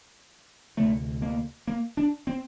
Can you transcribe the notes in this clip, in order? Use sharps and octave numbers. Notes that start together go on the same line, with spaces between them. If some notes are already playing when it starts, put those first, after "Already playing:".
D2 C3 A3
A#3
A#3
D4
C4